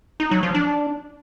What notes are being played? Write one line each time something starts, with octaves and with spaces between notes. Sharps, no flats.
D#4
F#3
F3
D4